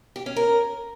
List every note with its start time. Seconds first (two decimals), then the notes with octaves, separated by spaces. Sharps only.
0.16 G4
0.26 C#4
0.36 A#4